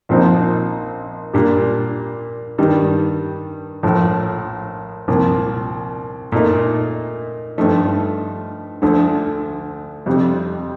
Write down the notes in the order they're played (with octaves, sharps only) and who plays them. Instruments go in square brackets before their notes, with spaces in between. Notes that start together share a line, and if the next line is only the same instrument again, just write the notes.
[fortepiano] A#1 A#2 F3 C4 D#4
A#2 G3 D4
G2 D#3 G3
A#1 A2 F3
C2 A#2 F3
A#2 A3 D#4
G2 F3 A3 D#4
D2 D3 F3 A3
F2 C3 G3